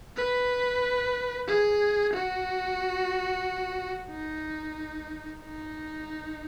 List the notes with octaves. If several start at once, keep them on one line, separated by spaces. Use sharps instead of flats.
B4
G#4
F#4
D#4
D#4